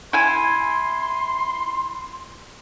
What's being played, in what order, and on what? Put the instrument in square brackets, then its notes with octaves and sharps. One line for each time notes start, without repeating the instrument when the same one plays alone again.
[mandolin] E4 G#5 [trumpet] C6